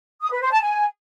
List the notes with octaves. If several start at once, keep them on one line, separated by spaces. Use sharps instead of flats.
D#6
B4
C5
A5
G#5